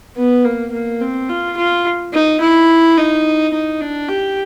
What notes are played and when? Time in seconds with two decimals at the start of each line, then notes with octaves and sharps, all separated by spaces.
0.17 B3
0.45 A#3
0.72 A#3
1.01 C4
1.29 F4
1.57 F4
2.13 D#4
2.41 E4
2.97 D#4
3.53 D#4
3.81 D4
4.09 G4